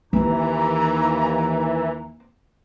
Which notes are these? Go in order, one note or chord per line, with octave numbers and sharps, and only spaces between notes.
D#2 E3 A#3 C4 A#5